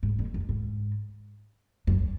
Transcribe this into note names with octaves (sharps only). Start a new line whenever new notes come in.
G#2
F2
F#2
G#2
F#2